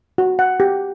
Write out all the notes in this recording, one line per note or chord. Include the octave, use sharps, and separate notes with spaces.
F#4
F#5
G4